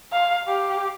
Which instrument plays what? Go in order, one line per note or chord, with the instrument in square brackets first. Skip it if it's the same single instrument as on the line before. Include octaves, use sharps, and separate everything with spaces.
[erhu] F5
G4